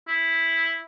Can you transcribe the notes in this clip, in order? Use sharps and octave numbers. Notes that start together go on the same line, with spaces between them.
E4